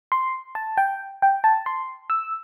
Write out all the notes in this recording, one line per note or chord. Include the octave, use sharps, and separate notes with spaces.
C6
A5
G5
G5
A5
C6
E6